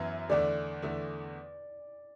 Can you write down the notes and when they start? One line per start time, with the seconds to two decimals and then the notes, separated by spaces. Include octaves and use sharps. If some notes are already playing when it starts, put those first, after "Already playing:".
Already playing: F#2 E3 B3 E4
0.29 E2 D3 A3 D5
0.82 E2 D3 A3